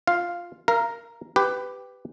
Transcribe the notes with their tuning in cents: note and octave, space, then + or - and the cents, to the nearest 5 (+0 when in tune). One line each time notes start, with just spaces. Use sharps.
F4 +0 F5 +0
A#4 +0 F5 -30
G4 +0 B4 +15